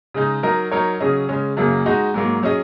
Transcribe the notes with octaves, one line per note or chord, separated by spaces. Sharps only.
C#3 G#3 D#4
F#3 D#4 A#4 D#5
F#3 D#4 A#4 C#5
C#3 F#3 C#4 G#4 D#5
C#3 G#3 C#4
F#2 C#3 F#3 A#3
G#3 D#4 F#4 D#5
G#2 F#3 A#3
F#3 C#4 G#4 D#5